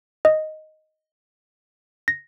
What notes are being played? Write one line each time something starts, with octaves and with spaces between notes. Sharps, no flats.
D#5
A#6